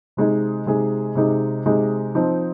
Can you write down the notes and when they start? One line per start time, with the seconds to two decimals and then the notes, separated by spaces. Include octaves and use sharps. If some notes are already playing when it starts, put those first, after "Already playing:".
0.17 C3 G#3 D#4 G#4
0.66 C3 G#3 D#4 G#4
1.15 C3 G#3 D#4 G#4
1.66 C3 G#3 D#4 G#4
2.15 F3 C4 D#4